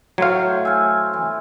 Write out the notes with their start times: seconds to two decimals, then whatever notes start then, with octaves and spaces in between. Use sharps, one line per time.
0.18 A2 F#3 C5 F5 C#6 G#6
0.65 G#5 E6 F6
1.13 E3